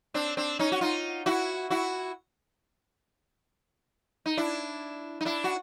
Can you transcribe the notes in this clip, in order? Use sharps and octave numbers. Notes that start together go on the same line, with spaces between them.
C4 D4
C4 D4
C#4 D#4
F#4
D#4 F4
E4 F#4
E4 F#4
D#4
D4 E4
D#4
D4 E4
F#4